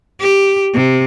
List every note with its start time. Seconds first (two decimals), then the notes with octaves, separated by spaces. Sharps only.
0.20 G4
0.74 C3